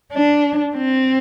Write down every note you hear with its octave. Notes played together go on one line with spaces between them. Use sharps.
D4
C4